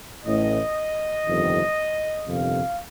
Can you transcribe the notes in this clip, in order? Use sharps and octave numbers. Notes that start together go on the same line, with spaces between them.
A1 A2 D#5
G1 F2 C3 D#3
G1 F2 C3 D#3 F5